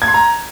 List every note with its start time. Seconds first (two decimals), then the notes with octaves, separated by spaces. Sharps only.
0.02 G#6
0.08 C6
0.14 A#5